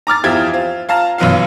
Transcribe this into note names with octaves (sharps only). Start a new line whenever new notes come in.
A#5 D6 F6 A6
E2 F3 E4 G4 F5 G#6
C4 F4
F4 F5 A5 A#5
B1 F#2 F#3 B3 F4 F5